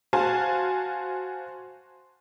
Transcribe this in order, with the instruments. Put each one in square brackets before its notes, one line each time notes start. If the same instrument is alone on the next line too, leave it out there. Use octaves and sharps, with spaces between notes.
[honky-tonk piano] F#4 C5 F5 G#5 A5